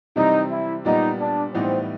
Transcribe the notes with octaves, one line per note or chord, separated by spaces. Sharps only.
C3 E3 G3 C4 D#4
E4
A#2 G3 B3 D#4
D4
A2 E3 G3 B3 C4 D#4